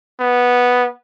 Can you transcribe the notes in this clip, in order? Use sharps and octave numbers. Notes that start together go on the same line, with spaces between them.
B3